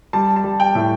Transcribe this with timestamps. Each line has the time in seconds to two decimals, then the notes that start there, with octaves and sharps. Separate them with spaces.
0.13 G3 A5
0.36 A5
0.44 G3
0.60 G5
0.75 A2